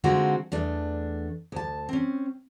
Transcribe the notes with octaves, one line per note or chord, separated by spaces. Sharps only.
D3 G#3 C4 D#4 F4 F#4
E2 A3 D4
D2 A5
C4 C#4